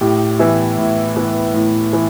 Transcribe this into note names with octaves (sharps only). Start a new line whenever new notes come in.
A2 G4
E3 B3 E4
A2
E3 B3
A2
E3